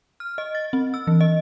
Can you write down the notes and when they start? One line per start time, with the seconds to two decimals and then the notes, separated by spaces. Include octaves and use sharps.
0.20 F6
0.38 D#5
0.55 A6
0.73 C4
0.94 E6
1.07 E3
1.21 D#5